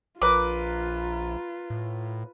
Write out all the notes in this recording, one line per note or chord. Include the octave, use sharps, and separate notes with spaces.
A#1 F4 A#4 B4 A#5 D6
A2